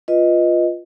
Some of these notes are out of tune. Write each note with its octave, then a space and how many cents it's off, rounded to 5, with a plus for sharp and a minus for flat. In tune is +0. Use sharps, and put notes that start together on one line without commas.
F4 +0 B4 +0 D#5 +0